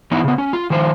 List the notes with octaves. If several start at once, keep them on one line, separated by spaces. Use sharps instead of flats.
E3 B3 D#4 E4
C#3 B3
C#4
F4
D#3 F3 C5